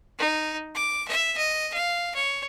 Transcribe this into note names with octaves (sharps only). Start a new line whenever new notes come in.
D#4
D6
E5
D#5
F5
C#5